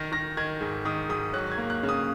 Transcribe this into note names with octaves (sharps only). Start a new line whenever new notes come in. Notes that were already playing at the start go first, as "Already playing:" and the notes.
Already playing: D#3 A#6
D#3 A#6
D#3 G#6
G#2
D#3 D#6
G#2 D#6
F#3 F#6
G#6
A#3
F#6
C#3
D#6